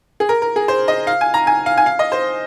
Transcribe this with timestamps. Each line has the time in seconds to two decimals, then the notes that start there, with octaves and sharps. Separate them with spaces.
0.20 G#4
0.29 A#4
0.42 A#4
0.56 G#4
0.68 C5
0.88 D#5
1.07 F5
1.21 G#5
1.34 A#5
1.47 G#5
1.66 F5
1.77 G#5
1.86 F5
1.99 D#5
2.12 C5